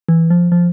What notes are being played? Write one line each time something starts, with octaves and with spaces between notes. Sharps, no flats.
E3
F3
F3